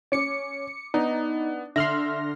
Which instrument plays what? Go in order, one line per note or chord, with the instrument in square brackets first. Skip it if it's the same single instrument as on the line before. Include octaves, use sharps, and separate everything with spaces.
[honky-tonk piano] C#4 [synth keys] D6 C#7
[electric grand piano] B3 [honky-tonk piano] D4 [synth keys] D#4
[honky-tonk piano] D3 F#7 [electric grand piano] E5 [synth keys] C6 F6 A#6